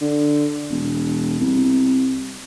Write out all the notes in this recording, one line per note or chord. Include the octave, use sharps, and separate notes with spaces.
D3
E1
C2